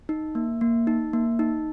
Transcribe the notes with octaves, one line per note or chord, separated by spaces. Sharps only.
D#4
A#3
A#3
D#4
A#3
D#4